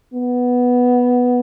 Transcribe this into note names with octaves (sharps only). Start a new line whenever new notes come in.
B3